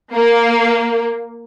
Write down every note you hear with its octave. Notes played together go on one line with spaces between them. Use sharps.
A#3